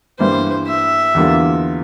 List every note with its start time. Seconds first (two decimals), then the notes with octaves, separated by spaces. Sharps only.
0.19 G2 E3 G3 A#3 E4 C5
0.67 E5
1.15 E2 D3 G3 A#3 F4